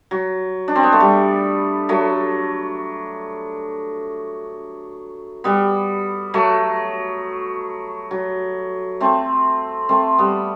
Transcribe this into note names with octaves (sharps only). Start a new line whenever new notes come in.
F#3
D4
C4
B3
A3
G3
F#3 A3
G3 B3
F#3 A3
F#3
A3 C4
A3 C4
G3 B3